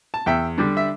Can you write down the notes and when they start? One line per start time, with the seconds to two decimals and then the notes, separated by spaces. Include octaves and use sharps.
0.14 A5
0.26 E2 E5 G5
0.58 D3 G3 D4
0.77 E5